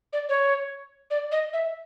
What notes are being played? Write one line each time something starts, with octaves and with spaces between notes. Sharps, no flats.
D5
C#5
D5
D#5
E5